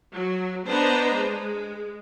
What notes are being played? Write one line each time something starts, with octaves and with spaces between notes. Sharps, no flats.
F#3
B3 D4 B4 C5 D#5 A#5
G#3